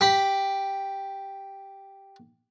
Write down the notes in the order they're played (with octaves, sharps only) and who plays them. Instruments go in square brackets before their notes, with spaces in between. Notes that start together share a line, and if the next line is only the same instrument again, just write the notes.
[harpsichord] G4 B5